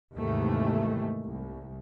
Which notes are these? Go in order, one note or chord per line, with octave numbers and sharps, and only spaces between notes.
D#2 G#2 C3 D#3 E3 A3
C2